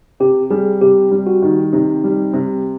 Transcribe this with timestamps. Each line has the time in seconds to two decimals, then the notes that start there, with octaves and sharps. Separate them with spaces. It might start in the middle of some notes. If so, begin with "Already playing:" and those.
0.20 C3 G4
0.50 G3 G#4
0.82 C3 G4
1.11 G3
1.27 F#4
1.42 D#3
1.73 C3 D#4
2.04 G3
2.34 C3